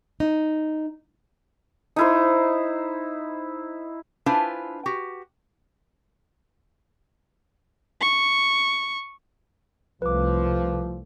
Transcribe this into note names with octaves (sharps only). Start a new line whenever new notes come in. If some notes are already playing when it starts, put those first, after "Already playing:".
D#4
D#4 E4 C5
D4 E4 F4 B4 C5 G#5
F#4 G4
C#6
C2 F3 A3 B4 D6